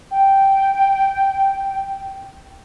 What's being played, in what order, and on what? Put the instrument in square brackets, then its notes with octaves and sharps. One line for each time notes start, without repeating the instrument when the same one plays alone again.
[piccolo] G5